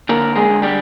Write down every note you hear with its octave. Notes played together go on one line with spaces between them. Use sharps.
D3 A#3 A#4
G#3 G#4
D3
G3 G4